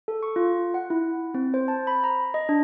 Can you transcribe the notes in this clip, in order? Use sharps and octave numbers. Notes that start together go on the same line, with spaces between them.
A4
C#6
F4
F#5
E4
C4
C5
A5
B5
A#5
D#5
D4